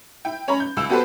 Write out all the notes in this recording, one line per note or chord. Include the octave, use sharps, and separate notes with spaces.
E4 G5
C#4 C#5 A#5 B5
G6
C#2 E6 E7
B3 F#4 G4 A4 B4 C5